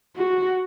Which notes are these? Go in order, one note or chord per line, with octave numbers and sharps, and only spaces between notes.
F#4